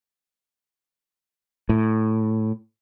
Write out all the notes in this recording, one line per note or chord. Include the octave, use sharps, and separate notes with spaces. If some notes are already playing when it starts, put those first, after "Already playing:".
A2